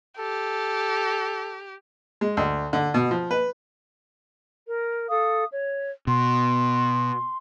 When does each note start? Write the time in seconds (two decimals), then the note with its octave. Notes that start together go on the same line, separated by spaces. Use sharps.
0.19 G4 A4
2.21 G#3
2.37 D2
2.73 D3
2.94 B2
3.11 F3
3.31 B4
4.67 A#4
5.10 A4 F5 D#6
5.53 C#5
6.07 B2 C6